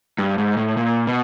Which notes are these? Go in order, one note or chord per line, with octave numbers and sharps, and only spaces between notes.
G2
G#2
A2
A#2
B2